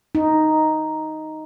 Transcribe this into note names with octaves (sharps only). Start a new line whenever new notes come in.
D#4